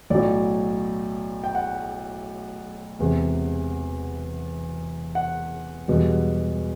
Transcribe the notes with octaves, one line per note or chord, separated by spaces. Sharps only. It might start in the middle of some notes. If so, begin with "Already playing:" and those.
B1 A2 F#3 D5
G5
F#5
E1 E2 C3
F#5
E1 E2 B2 G3